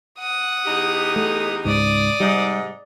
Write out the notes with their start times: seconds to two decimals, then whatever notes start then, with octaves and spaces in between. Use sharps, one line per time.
0.19 F#5 D#6
0.66 E2 D#4 G4
1.16 A3
1.65 C#2 G#2 D5 D#6
2.20 G#2 C3 G3 D#4